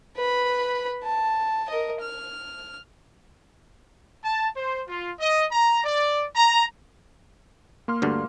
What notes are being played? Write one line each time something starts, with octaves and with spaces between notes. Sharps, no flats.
B4 B5
A5
A#4 D#5
F6
A5
C5
F4
D#5
A#5
D5
A#5
A#3 C6 F6
D2 G2 D3